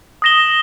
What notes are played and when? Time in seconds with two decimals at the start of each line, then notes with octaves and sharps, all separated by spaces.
0.22 D#6 A#6 E7 G7